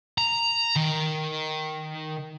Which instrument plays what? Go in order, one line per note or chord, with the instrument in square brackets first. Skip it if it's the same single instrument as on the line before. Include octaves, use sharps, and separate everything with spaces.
[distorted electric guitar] A#5
D#3